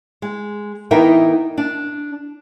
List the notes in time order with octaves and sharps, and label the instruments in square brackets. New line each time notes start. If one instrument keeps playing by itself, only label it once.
[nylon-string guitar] G#3
E3 B3 D#4 A#4 E5 G5
D4